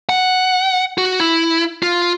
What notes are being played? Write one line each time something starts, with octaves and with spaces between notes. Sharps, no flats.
F#5
F#4
E4
F4